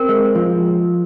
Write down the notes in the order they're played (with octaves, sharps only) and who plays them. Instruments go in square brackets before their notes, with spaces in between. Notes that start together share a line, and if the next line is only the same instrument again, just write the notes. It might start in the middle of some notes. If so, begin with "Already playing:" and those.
Already playing: [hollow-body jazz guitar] C4 [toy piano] A#4
[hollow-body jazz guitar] G#3
F3